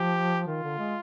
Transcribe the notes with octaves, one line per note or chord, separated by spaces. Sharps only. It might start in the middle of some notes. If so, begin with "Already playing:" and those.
Already playing: F3 G4
D#3 F4
D3
G#3